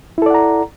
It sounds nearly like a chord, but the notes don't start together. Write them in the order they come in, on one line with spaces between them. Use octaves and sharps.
E4 A4 D5 F#5 A#5